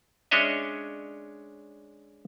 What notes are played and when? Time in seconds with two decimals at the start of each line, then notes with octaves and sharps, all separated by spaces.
0.31 G#3 C#4 D4 C#5 D#5 E5